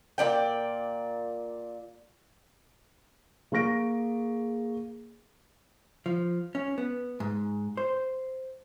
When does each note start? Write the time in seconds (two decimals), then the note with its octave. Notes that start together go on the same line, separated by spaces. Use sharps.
0.18 A#2 C#3 D5 G5
3.52 A#3 G#4 C#6 A#6 D7
6.06 F3
6.55 C#4
6.78 B3
7.20 G#2
7.77 C5